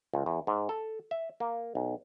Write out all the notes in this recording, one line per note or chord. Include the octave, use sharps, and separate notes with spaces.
C#2
E2
G#2
A4
E5
A#3
B1